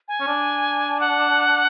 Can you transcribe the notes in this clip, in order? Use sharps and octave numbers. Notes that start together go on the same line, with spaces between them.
G#5
C#4
D4
F#5